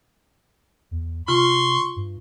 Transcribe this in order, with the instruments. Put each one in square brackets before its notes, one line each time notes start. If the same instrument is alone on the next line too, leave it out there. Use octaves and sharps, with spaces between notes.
[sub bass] E2
[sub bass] C3 [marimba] F4 [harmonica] C6 C#6
[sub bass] G2